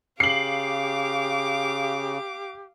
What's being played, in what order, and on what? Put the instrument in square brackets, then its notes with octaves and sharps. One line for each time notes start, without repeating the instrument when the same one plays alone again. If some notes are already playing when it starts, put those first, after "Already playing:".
[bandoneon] C#3 [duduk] G4 [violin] F5 D6 [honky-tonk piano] C7 F#7